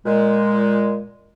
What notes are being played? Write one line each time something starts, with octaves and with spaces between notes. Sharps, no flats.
A#2 G#3